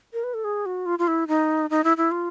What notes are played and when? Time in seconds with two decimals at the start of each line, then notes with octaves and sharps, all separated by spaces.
0.13 A#4
0.24 B4
0.34 A4
0.44 G#4
0.66 F#4
0.86 F4
0.99 F4
1.08 E4
1.28 D#4
1.70 D#4
1.84 E4
1.97 E4
2.11 F4